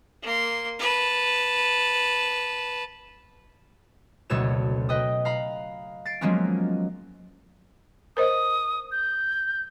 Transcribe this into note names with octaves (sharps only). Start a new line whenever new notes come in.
A#3 C6
B4 A5
F#1 D2 B2 A4 C#5 E7
B4 D#5 G5 D#6
F5 A#5 B5
A6 C7 D7
F3 F#3 G#3 A#3 B3 C#4
A#4 C5 D#5 D#6
G6